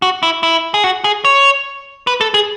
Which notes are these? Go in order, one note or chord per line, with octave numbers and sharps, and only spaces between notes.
F#4
E4
E4
G#4
F#4
G#4
C#5
B4
A4
G#4